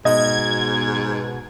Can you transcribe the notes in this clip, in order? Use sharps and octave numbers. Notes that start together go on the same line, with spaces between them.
G#2 B2 D#5 G#6